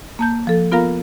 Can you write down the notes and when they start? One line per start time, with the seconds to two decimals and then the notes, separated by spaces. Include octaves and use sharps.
0.19 A#3 A5 G6
0.47 F3 A4
0.72 B3 F4 A#4 F5 A#5